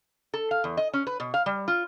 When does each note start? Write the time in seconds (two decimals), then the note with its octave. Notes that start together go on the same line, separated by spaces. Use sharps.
0.34 A4
0.51 F5
0.64 E2
0.77 D#5
0.93 C#4
1.07 B4
1.20 B2
1.34 F5
1.46 G3
1.68 F4